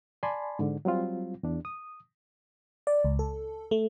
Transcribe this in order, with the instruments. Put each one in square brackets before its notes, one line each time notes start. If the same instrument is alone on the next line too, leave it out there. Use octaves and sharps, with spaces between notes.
[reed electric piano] D5 G#5 A5 B5 C6
G#2 D3
F#3 G3 C4 F4
E2 D4
D#6
[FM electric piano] D5
C#2
A4
A3